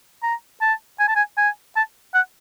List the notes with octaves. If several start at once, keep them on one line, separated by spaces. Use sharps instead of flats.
A#5
A5
G#5
A5
G#5
G#5
A5
F#5